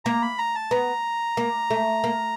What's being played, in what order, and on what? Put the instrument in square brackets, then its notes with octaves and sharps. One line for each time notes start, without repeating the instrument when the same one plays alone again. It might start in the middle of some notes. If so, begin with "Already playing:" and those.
[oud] A#3 [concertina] A#5
[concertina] B5
A#5
A5
[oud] B3 [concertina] A#5
[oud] A#3
A3
A#3